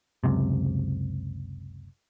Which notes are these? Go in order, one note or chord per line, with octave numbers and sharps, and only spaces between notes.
F#1 C#2 C3